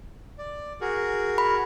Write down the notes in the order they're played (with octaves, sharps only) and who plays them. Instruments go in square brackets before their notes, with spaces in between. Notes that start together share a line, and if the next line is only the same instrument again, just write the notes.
[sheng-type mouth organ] D5
F#4 G#4 A#4
[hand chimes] B5